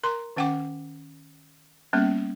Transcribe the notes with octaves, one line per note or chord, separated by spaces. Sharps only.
A#4 A#5 C6
D#3 C#4 F#5 G5 D6
G3 A#3 B3 C#4